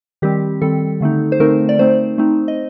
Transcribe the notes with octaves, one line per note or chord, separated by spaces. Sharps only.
D#3 G3 C4 G4
D#3 G3 C4 A4
D3 A3 C4 D#4
C5
D3 A3 C4 D#4 A#4
D5
A3 C4 D#4 C5
A3 C4 D#4
D#5